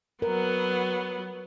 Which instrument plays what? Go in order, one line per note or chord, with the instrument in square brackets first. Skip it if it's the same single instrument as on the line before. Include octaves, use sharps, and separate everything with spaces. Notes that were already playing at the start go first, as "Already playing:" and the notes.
[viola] F#3 B3 [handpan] A#4